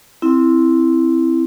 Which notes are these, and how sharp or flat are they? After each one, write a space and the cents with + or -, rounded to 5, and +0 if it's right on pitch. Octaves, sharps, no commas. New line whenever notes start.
C4 +0 E4 +0